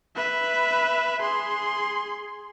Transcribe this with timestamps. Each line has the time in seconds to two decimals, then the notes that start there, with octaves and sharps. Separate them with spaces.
0.16 B4 E5
1.22 G#4 C6